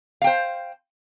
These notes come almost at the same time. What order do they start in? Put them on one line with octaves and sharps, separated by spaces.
F5 G5 C5